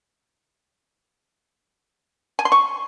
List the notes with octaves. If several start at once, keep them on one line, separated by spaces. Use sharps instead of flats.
G#5
C6
C#6